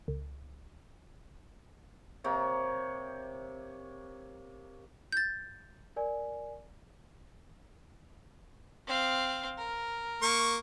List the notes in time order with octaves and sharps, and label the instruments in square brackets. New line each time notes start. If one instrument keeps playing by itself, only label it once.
[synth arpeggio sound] C#2
[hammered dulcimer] C3 A#3 C#5
[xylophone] G6 A6
[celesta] A#4 D5 G#5
[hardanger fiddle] C4 F5
A#4
[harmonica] A#3 C#6